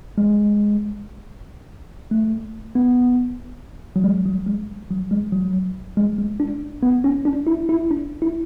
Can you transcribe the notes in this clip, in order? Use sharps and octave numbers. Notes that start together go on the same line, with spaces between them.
G#3
A3
B3
F#3
G#3
F#3
G#3
F#3
G#3
F#3
G#3
G#3
D4
B3
C#4
D4
E4
E4
D4
E4